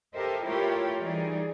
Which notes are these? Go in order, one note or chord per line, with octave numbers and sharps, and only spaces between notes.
G4 A4 A#4 C5 D#5 E5
A3 E4 F4 G4 A#4 C#5
E3 G3 D#4 G#4 D5